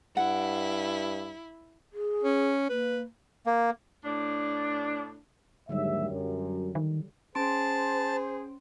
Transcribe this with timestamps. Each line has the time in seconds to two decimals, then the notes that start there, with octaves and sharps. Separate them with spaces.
0.17 G2 E4 F#5
1.93 G#4
2.24 C#4
2.70 A#3 B4
3.46 A#3
4.03 A2 D4
5.69 D#2 G#2 D3 F#3 G3 E5
6.09 F#2
6.75 D#3
7.35 C#4 G#4 C5 A5 C6 D7